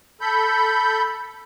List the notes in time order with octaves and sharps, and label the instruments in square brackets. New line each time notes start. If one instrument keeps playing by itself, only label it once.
[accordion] A4 B5 G6